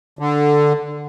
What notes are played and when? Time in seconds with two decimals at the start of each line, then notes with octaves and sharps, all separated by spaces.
0.19 D3